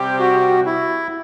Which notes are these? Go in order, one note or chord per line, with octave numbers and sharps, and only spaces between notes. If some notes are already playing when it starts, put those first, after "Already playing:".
Already playing: C3 G3 C4 G4
F#4
E4